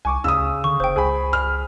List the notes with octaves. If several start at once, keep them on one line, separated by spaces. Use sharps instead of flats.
C2 G#5 C#6 D6
D2 C#3 D#6 E6
D3 C#6
F#1 C5 G5
C#2 G#4 G#5 B5
F6